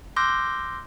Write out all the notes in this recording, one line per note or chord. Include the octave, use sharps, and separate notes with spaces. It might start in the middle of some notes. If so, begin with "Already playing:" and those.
C6 D6 E6 F#6 G6 A#6